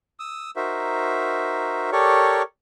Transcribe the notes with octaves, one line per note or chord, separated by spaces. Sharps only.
D#6 E6
D#4 F#4 A#4 C5 E5
G4 A4 A#4 C#5 D5 C#6